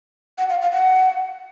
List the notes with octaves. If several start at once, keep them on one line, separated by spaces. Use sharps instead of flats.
F#5
F5
F5
F#5